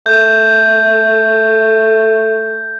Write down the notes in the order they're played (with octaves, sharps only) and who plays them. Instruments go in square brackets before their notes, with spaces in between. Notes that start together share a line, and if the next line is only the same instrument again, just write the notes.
[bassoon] A3 [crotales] G6